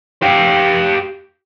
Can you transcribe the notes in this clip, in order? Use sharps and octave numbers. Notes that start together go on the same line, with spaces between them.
G4 F5